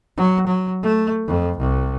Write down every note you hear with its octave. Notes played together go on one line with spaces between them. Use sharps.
F#3
F#3
A3
F2
C2